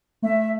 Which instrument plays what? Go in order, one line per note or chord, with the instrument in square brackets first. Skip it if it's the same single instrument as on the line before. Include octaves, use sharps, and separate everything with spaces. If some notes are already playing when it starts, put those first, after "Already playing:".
[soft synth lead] A3 [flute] E5